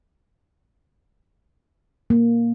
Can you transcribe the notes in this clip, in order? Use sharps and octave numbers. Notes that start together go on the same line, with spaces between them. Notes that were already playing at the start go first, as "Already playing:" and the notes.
A#3